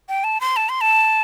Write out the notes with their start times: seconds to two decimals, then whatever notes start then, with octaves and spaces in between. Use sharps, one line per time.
0.09 G5
0.24 A5
0.41 C6
0.56 A5
0.69 C6
0.81 A5